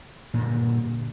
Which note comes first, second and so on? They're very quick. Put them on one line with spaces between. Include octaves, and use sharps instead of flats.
A#2 G2 D3